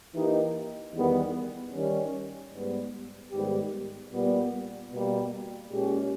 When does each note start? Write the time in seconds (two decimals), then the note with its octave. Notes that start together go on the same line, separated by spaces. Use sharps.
0.13 E3 A#3 D#4 G4
0.93 E2 D#3 G3 B3
1.72 D#3 G3 C#4
2.52 G#2 G3 B3
3.32 G#2 D#3 G3 B3 G4
4.11 A#2 G3 B3
4.91 B2 G3 A#3
5.71 A#2 G#3 C#4 G4